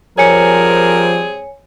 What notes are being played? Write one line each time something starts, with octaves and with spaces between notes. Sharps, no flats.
F3 G3 C4 G#4 A#4 C#5 G#5 C#7